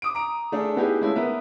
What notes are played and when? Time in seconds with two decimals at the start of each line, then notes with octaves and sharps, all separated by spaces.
0.02 D6 D#6 D7
0.15 A#5 D7
0.52 A3 D4 G#4
0.77 B3 D#4 E4 G4 G#4
1.01 G#3 A3 C#4 E4 F4
1.16 B3 A#4 B4 E5